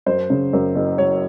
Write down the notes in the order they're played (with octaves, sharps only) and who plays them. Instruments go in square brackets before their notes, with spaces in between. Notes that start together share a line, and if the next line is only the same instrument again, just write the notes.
[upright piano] F#2 C5
C#3
F#2
F#1
F#3 C#5